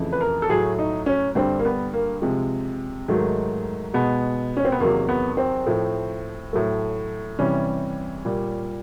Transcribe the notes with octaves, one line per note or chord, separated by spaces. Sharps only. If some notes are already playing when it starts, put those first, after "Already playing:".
Already playing: F2 C#3 E3 A3
B4
A#4
A4
A2 F#3 A3 G#4
D#4
C#4
G2 D3 G3 C4
A#3
B3
A#3
C3 F3 G#3
G#2 D#3 F#3 A3
B2 G#3 B3
C#4
C4
B3
E2 C3 D#3 F#3 A#3
B3
C4
A2 F3 A3
A2 F#3 A3
C3 E3 G3 C#4
A#2 G3